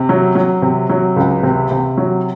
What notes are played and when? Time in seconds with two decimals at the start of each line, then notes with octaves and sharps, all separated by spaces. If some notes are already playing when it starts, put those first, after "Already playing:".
Already playing: C3
0.09 F#3
0.35 F#3
0.62 C3
0.90 F#3
1.16 C#2
1.43 C3
1.71 C3
1.98 F#3